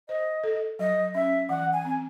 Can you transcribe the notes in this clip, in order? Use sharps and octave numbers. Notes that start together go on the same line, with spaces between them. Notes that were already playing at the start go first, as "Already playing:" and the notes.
C5 D#5
A4
F#3 D#5
C#4 E5
E3 F#5
G#5
C4